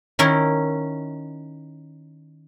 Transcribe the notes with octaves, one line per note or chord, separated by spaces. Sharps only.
D#3 C#4 E4 A#4